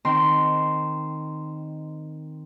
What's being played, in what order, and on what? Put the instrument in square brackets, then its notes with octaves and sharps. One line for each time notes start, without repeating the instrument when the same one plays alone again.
[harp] D#3 C4 C6